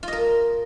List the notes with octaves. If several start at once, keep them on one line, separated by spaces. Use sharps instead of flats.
F4 A#4 D#5